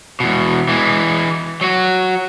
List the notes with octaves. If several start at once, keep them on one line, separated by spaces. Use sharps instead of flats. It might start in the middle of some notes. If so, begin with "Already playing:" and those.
E2 B2
E3 G#3
F#3 F#4